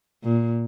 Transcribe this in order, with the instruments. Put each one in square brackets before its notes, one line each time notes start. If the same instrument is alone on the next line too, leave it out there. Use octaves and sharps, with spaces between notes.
[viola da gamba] A#2